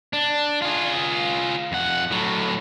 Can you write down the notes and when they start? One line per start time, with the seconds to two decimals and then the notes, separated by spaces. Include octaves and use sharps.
0.13 D4
0.62 F4 G#4
1.72 F2 F#5
2.11 A2 F#3